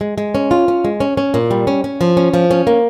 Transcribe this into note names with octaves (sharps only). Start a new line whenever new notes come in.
G#3
G#3
C#4
F4
C#4
G#3
C#4
C#4
A#2
G3
C#4
C#4
F3
C#4
F3
C#4
A#3